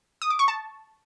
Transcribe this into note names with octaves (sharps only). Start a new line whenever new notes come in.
D#6
D6
C#6
A5